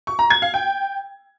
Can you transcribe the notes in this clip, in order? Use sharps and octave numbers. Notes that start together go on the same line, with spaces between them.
C#6
A#5
G#6
F5
G5